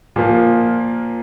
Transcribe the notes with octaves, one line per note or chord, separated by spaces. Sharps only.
A#2 F3 A#3 F4